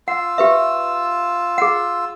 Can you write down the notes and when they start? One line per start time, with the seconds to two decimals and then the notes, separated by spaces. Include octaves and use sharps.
0.08 F4 F#5 E6
0.38 G4 B4 E5
1.58 G#4 F#5